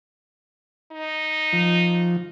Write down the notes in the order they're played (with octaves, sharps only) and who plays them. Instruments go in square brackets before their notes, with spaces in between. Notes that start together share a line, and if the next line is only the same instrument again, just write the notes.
[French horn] D#4
[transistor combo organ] F3